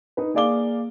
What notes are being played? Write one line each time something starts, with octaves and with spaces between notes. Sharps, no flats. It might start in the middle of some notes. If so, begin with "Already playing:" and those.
D#4 B4
A#3 G#4 D5 F5 D6 G7